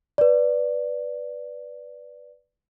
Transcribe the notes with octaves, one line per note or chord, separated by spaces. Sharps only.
B4 D5